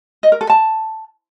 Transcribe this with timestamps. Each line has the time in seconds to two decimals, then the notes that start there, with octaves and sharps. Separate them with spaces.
0.23 D#5
0.32 A#4
0.41 A4
0.50 A5